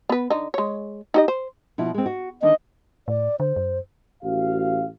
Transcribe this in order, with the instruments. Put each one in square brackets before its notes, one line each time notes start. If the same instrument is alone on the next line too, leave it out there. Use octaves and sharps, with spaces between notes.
[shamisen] B3 B4
D3 D#4
G#3 C#5
D#4 G4 D#5
C5
[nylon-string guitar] B2 F3 E4
G#3 C4
F#4
[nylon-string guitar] D3 D#3 D4 [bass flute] D#5
[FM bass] A2 [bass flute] D5
[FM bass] D3 [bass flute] C5
[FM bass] F#2
[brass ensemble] A1 F#4 F5